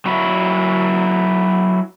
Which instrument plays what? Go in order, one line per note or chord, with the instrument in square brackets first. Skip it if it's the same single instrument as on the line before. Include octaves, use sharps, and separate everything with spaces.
[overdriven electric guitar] F#3 E4